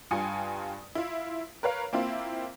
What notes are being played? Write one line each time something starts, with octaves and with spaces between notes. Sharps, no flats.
G2 F4 G5 G#5 D#6 C#7
E4 F4
A#4 B4 C#5 F5
A#3 C4 E4 F4